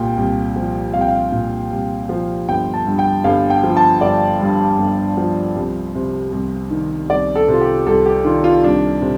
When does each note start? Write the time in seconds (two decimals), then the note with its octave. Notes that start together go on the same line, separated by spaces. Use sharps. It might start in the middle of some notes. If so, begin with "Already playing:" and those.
Already playing: C2 A#2 G5
0.17 C2
0.56 F3
0.93 C2 F5
1.01 G5
1.08 F5
1.32 A#2
1.71 C2
2.09 F3
2.48 G1 G5
2.74 A5
2.87 G2
2.99 G5
3.24 G1 F5
3.50 G5
3.63 F3
3.77 A5
4.01 G1 D5
4.41 G2
4.78 G1
5.17 F3
5.55 C2
5.95 C3
6.32 C2
6.71 D#3
7.09 C2 D5
7.36 A4
7.48 C3 F4
7.61 G4
7.87 C2 A4
8.05 G4
8.24 D#3 F4
8.44 F4
8.64 C2 D4
9.01 C3